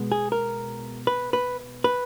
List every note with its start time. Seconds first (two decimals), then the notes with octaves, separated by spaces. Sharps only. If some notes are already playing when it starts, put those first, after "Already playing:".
Already playing: B2 G#3 B3
0.12 G#4
0.32 A#4
1.07 B4
1.33 B4
1.84 B4